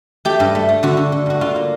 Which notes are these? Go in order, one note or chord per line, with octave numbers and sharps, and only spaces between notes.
A3 G4
G2
A3
A3
D3 F#4
D3
D3
G2 F#4
D3 F4
A#3